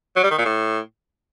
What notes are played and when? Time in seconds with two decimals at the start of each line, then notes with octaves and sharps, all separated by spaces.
0.16 F#3
0.23 G3
0.31 D#3
0.38 A#2
0.45 A2